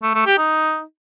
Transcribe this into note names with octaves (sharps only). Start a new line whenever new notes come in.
A3
A3
G4
D#4